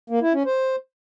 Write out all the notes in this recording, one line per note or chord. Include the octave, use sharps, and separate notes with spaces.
A#3
E4
C#4
C5